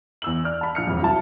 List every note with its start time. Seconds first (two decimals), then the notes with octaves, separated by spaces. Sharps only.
0.22 E2 E6 F#7
0.45 D5 F6
0.61 A5 B5
0.75 A#1 F6 C#7
0.87 E1 F2
1.01 C2 F#3 E4 A5